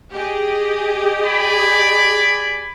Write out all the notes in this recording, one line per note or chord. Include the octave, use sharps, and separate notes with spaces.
G4 G#4 D#5
D5 G#5 B5